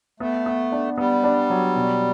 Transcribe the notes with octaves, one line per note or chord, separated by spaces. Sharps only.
A3 B3
B3
D4
G3 B3
D4
F#3
B2